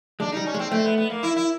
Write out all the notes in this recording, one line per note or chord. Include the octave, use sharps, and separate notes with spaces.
G#3 D4
G3 D#4
C#4
G#3
C4
A3 C4
B3
B3
A#3
E4
E4